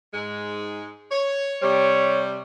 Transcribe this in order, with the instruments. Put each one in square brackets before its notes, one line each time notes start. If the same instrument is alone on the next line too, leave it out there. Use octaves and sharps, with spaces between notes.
[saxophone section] G#2 G#3
C#5
[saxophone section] C3 G3 [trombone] C#5